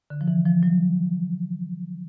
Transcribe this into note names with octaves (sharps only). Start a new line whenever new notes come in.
D3
F3
E3
F3
F#3